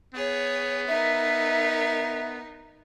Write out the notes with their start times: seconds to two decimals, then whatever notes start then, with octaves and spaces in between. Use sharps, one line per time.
0.15 B3 G#4 C#5
0.88 D#4 A#4 E5